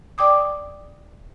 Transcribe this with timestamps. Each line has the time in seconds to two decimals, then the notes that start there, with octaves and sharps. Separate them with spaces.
0.18 D5 G5 D6 D#6